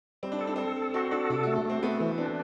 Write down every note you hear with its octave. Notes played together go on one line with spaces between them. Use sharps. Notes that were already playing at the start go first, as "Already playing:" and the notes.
G3 C4
D4
C4 A4
D4
C4 A4
A4
C4 F#4
D4 A4
C3 D4
A3 F#4
A4
A3 C4
A3 B3
E3 C4
C4 D4